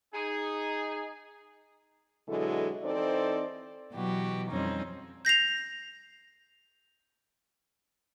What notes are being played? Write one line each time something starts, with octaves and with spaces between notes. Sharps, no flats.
D#4 G#4
B2 D3 F#3 G#3 E4 A4
E3 C4 D#4 A4 C5 D5
B2 E3 F#3 F#4 G4
F2 E3 G3 C4 C#4 D#4
G6 A#6 C7 F7